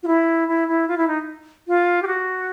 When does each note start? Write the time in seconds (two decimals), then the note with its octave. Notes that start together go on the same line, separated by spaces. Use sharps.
0.03 F4
0.07 E4
0.48 E4
0.68 E4
0.88 F4
0.97 E4
1.08 D#4
1.68 F4
2.02 G4
2.07 F#4